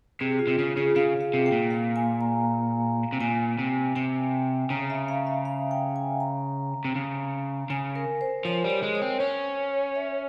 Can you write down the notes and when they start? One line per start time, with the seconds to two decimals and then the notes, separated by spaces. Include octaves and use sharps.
0.20 C3 G#4
0.39 F4
0.47 C3
0.58 C#3 F4
0.77 C#3 G#4
0.96 C#3 F5
1.21 F5
1.34 C3
1.46 G5
1.52 A#2
1.71 F5
1.96 G#5
2.21 A#5
3.13 C3
3.21 A#2 G#5
3.59 C3
3.96 C3 G5
4.70 C#3 A#5
4.90 E5
5.08 F5
5.27 E5
5.45 F5
5.71 G5
5.96 G#5
6.20 A#5
6.85 C3
6.95 C#3
7.70 C#3 G#5
7.96 A#4
8.21 C5
8.45 F3 C#5
8.64 G3
8.70 C#5
8.83 G#3
8.95 C#5
9.02 C4
9.20 C#4 C#5
9.95 E5